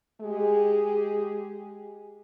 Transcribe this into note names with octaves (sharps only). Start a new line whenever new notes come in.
G#3 G4 G#4